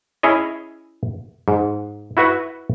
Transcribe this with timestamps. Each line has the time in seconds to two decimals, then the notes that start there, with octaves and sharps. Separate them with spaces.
0.23 C#4 E4 G#4 C#5 D#5
1.48 G#2
2.17 E4 F#4 B4 E5 F#5